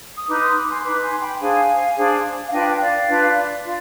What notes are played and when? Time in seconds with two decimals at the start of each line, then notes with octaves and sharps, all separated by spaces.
0.18 D#6
0.28 D#4 B4 B5 D6
0.42 C6 D#6
0.56 B5 D6
0.70 G#5 C6
0.84 D#4 B4 B5 D6
1.02 G#5 C6
1.22 G5 B5
1.40 D4 G#4 C5 F5 G#5
1.96 D4 G#4 C5
2.47 F5
2.52 D4 F4 B4 D#5 G5
2.69 G5
2.80 D5 F5
3.08 D4 F4 B4
3.63 F4 D5